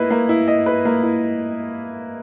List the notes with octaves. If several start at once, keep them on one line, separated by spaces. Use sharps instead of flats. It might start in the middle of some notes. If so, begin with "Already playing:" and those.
Already playing: A#3 E4 B4 D#5
A#3
E4
D#5
B4
A#3
E4